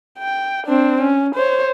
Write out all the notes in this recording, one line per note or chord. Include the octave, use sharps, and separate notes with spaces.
G5
C4 D4
C#4
C5 C#5